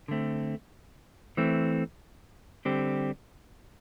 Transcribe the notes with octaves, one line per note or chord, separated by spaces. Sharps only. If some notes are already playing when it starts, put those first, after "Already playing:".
D3 A3 C4
E3 A3 C4
D3 G3 C4 G4